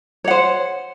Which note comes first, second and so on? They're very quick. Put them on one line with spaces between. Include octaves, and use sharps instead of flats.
C#5 F#5 C5